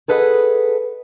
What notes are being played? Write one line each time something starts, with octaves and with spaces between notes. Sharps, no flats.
G#4 A4 B4 D#5 F#5